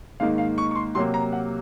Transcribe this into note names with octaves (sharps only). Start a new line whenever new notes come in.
G#2 D#3 A#3 F5
F5
C#6
C#6
C6
C3 F#3 A#3 C6
A#5
F#5